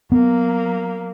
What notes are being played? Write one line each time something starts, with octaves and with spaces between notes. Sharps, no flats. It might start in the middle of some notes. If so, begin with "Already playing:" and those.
F#3 A#3 B3